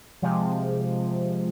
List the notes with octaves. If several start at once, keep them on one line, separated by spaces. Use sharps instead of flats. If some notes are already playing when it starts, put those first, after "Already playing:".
C3 F3 G#3